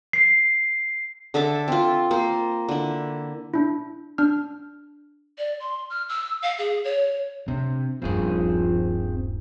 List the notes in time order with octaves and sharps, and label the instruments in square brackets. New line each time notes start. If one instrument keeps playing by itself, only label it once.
[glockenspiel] C7
[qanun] D3 A4 E5 D6
C4 F4
A#3 C5
D3 E4
[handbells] D4 E4
D4 F6
[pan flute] D5
C6
F6
E6
F5
G#4
C#5
[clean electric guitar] C3 C4 [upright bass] D4
[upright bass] D#1 G2 [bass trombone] F3 [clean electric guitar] C4 F4 G#4